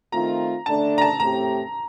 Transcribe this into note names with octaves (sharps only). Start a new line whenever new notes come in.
D#3 A3 C4 F4 A#5
D3 A3 D4 A5
A#5
A5
A2 A3 C4 G4 A#5